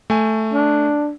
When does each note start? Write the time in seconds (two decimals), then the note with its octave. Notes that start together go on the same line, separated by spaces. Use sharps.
0.10 A3 G#5
0.53 D4